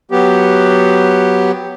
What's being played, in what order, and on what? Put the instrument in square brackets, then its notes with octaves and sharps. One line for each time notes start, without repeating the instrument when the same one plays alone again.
[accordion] F#3 B3 G4